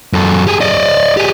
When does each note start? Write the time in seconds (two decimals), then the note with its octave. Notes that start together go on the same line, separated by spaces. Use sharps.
0.13 F#2 A4
0.47 G4 G#4
0.61 D5 D#5
1.17 G4 G#4